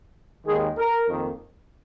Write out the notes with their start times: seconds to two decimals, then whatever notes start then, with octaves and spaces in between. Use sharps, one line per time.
0.47 D#2 D#3 G#3 G#4
0.78 A#4
1.08 F2 D#3 A#3